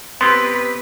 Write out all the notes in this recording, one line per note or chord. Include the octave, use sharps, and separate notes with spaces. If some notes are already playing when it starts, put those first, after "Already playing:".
B3 C4 G4 B4 C6